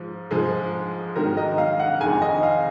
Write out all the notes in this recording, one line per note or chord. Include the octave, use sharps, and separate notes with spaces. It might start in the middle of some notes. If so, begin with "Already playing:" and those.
Already playing: G#2 F3
G#2 F3 G#3
G#2 D#3 F#3 A#4
D#5
F5
F#5
F2 D#3 G#3 G#5
D#5
F5